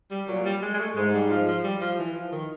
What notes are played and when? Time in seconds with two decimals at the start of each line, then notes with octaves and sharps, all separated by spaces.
0.11 G3
0.28 A#2 F#3
0.45 G3
0.62 G#3
0.74 G#3
0.79 A3
0.96 G#2 G#3
1.13 G3
1.30 F3
1.48 F3
1.64 G3
1.81 F3
1.98 E3
2.15 F3
2.32 D#3